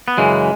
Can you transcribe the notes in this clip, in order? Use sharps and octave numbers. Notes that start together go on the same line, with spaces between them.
B3
F#2 C#3 E3 G#3